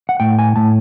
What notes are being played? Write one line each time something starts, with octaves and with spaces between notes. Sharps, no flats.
F#5
A2 G5
G#5
A2 A5